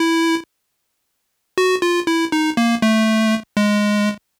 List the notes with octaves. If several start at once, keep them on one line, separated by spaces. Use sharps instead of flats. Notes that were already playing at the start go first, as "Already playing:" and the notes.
Already playing: E4
F#4
F4
E4
D#4
A#3
A3
G#3